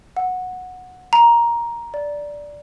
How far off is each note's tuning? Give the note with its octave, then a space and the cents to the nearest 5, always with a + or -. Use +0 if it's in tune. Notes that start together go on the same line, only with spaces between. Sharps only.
F#5 -10
A#5 +10
D5 -5